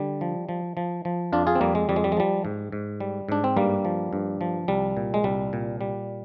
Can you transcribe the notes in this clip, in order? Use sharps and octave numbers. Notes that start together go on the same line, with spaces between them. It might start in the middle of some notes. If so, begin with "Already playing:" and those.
Already playing: D3 G3
F3
F3
F3
F3
F2 D4 F4
F4 G#4
C4
F2 G3 A#3
G#3
F2 G3
G#3
G3
G#3
F3 G3
G#2
G#2
G3
G#2 D4
C4
G2 G3 A#3
F3
G2
F3
C2 G3
A#2
G#3
C2 G3
A#2
G3